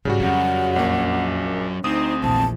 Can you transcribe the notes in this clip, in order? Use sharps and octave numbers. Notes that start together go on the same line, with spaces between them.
G#2 C#3 G3 F#4
F2 F#3 C4 C#4 F#5
A#1 A#3
D2 C4 D#4 D#6
A#1 E2 A5